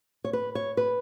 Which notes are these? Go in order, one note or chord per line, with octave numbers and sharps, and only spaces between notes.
C#5
B4
C#5
B4